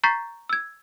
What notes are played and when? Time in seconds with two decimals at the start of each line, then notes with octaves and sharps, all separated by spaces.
0.04 A#5 C#6 G6 A6 B6 C7
0.49 E6 G#6